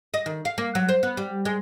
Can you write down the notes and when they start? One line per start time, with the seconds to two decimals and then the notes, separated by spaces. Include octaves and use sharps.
0.14 D#5
0.26 D#3
0.45 F5
0.58 A#3
0.75 F#3
0.89 C5
1.03 B3
1.17 G3
1.45 G#3